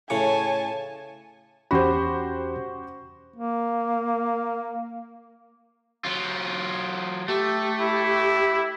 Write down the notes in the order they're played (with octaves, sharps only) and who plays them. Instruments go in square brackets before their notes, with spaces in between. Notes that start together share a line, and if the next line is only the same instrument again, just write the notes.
[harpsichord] A2 C#3 C#6 [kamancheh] G#5 A5
[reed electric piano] E2 C#4 B5 [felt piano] F#4 G4 C5
[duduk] A#3
[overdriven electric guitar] F#3 F4
[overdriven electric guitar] A3 [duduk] G4
[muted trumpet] E4